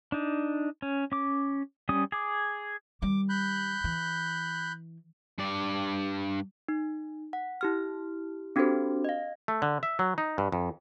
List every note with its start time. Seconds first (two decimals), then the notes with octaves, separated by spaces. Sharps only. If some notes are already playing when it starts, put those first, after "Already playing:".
0.12 D4 D#4
0.82 C#4
1.12 C#4 D6
1.89 G3 C#4 D#6
2.12 G#4 D6
3.02 D#3 G3 D6
3.29 B5 F#6 G6
3.84 E3
5.38 G2 D5
6.68 D#4
7.33 F#5
7.61 E4 G4 F6
8.56 C4 D4 F#4 G4 A4 C5
9.05 D#5 F5
9.48 A3
9.62 D3
9.83 E5
9.99 F#3
10.18 D#4
10.38 G2
10.52 F2